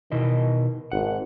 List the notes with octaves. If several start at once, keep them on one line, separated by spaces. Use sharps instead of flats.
B2 D#3 E4 D#5
G#1 F#5